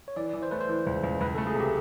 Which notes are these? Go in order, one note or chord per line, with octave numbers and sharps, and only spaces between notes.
C#5
E3 D5
E3
C5
A3 B4
C5
E3
C#2
C#2
C#2 B4
A4
A3
G#4
C3
G4